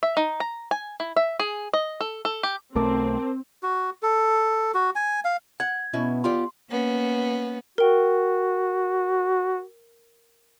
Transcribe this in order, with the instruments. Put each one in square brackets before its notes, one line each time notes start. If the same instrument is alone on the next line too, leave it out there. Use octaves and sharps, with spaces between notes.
[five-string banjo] E5
D#4
A#5
G#5
E4
E5
G#4
D#5
A4
A4
G4
[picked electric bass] B1 A3 [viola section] C4 [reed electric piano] A#4 A5 D6
[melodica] F#4
A4
F#4
G#5
F5
[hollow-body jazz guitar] F#5 [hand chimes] G#6
[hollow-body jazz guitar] B2 C#4 E4 [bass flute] B3
[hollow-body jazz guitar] F4 G4 D5 [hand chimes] C6
[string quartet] A#3 B3 C#4
[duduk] F#4 [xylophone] A#4 G5